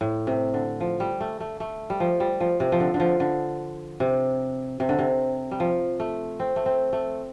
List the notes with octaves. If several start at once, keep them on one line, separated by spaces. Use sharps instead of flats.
A2
C3
D3
F3
G3
A3
A3
A3
G3
F3
G3
F3
C3
F3
D3
D3
F3
D3
C3
C3
D3
C3
G3
F3
A3
C4
A3
C4
A3